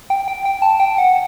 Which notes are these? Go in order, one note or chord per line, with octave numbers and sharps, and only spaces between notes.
G5
G5
G5
A5
G5
F#5